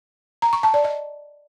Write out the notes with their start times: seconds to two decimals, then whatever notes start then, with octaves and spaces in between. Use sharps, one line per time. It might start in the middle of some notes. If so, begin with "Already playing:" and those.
0.42 A#5
0.53 C#6
0.63 A5
0.74 D5
0.84 D#5